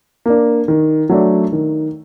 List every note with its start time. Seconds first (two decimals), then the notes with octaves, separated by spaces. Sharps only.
0.26 A#3 D4
0.68 D#3
1.09 F#3 A3 D4
1.52 D#3